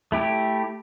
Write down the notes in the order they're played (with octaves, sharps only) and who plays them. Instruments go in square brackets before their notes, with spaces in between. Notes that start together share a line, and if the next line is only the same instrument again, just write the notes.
[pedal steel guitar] A3 E4 G4